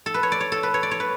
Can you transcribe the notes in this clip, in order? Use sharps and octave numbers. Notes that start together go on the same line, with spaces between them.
A4
B4
C#5
D5
C#5
A4
B4
C#5
D5
C#5
B4